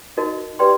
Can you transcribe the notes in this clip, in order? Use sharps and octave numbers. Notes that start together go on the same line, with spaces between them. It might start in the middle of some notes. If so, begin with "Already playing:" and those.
D#4 F#4 A#4 D#5
G4 B4 D5 G5 C6